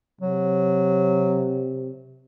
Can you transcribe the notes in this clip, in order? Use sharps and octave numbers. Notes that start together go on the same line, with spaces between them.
C3 F#3